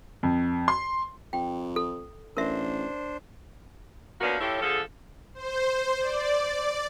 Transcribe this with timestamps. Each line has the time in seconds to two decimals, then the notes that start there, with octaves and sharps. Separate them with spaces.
0.23 F2
0.68 C6
1.33 F2 G5
1.76 A4
2.37 A1 D4 A#4 C5 E5
4.21 F3 A#3 B3 C#4 D4 F#4
4.41 F3 E4 G4 A4 C#5
4.62 D3 F3 G#4 A4
5.34 C5
6.00 D5